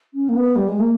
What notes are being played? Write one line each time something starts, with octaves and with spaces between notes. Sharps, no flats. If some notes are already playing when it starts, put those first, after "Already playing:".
C#4
A#3
B3
G3
G#3
A#3